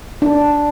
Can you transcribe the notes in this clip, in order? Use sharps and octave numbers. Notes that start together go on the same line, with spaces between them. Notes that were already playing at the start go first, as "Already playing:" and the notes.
D4